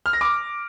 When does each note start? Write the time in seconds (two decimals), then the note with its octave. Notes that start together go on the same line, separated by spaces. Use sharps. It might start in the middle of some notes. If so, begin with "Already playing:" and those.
0.06 F6
0.13 A#6
0.21 D6